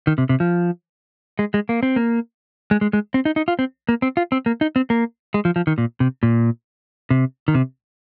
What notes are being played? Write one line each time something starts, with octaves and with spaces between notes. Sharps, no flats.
D#3
C3
C3
F3
G#3
G#3
A#3
C4
A#3
G#3
G#3
G#3
C4
D#4
D#4
F4
C4
A#3
C4
F4
C4
A#3
D#4
C4
A#3
G#3
F3
F3
D#3
A#2
C3
A#2
C3
D#3
C3